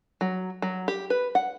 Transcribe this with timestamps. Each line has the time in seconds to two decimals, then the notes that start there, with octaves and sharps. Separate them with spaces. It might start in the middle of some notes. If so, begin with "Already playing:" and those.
0.21 F#3
0.62 F#3
0.88 G4
1.10 B4
1.35 F#5